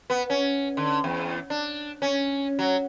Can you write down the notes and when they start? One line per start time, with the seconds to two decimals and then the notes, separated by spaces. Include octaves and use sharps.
0.10 B3
0.30 C#4
0.77 D3
1.04 E2
1.50 D4
2.02 C#4
2.59 F#3